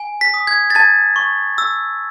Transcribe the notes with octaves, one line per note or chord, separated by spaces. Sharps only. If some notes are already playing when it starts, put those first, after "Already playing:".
Already playing: G#5
B6
D#6
G#6
A6
A5 G#6
C#6
E6